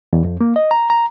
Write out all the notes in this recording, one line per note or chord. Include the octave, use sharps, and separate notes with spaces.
E2
F2
A#3
D#5
A#5
A#5